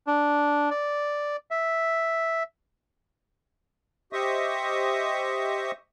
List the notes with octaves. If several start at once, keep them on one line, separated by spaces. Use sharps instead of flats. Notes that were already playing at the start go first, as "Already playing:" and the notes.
D4
D5
E5
G4 C5 D#5 E5 C#6 D#6